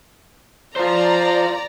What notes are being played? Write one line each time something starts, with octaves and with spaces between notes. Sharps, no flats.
F4 C5 D5 A#5